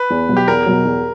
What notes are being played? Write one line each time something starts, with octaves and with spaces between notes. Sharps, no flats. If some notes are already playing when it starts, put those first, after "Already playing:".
Already playing: B4
E2
B2 F#3
G4
E2 A#4
B2 F#3
E2